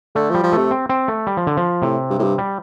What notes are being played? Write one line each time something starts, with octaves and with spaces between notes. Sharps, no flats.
D3 A3
F3
G3
F3
C3 A3
C4
C4
A3
G3
F3
D3
F3
A2 C3
G2
A2
G2
G3